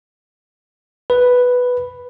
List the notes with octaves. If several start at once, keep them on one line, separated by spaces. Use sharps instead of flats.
B4